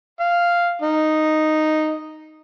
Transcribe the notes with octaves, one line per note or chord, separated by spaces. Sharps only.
F5
D#4